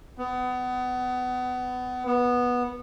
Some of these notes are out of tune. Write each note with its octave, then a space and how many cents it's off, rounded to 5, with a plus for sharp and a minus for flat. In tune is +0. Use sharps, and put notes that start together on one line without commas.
B3 +25
B3 -10